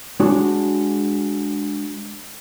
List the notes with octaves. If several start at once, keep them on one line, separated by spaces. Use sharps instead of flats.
G#3 D4 F#4 G#4 C#5